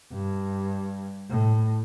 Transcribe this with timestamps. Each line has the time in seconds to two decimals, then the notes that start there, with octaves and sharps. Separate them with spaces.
0.13 G2
1.29 A2